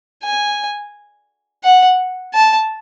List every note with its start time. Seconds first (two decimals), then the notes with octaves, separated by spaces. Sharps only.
0.24 G#5
1.64 F#5
2.34 A5